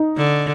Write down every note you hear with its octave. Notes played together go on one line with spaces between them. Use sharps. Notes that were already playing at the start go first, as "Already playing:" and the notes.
Already playing: D#4
D3